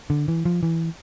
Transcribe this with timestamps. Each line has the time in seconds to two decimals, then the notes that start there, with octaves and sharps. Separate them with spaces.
0.10 D3
0.28 E3
0.45 F3
0.63 E3